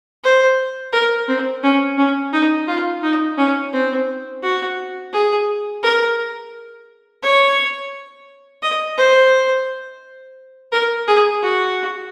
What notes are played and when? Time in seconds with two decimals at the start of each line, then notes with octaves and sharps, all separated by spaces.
0.24 C5
0.93 A#4
1.28 C4
1.64 C#4
1.98 C#4
2.33 D#4
2.67 F4
3.03 D#4
3.38 C#4
3.73 C4
4.42 F#4
5.13 G#4
5.83 A#4
7.23 C#5
8.62 D#5
8.97 C5
10.72 A#4
11.07 G#4
11.42 F#4